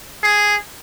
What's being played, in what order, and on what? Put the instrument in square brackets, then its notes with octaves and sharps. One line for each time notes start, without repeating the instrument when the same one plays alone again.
[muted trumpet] G#4